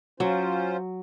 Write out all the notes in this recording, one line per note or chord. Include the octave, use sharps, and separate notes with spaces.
F#3 C#4 F4 C5